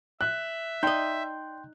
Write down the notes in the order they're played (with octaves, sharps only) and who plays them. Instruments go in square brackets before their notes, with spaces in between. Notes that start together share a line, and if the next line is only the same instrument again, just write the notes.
[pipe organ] E5 [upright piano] F#6
[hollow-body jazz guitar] D#4 D#5 [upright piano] D5 [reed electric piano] G5 C6 G6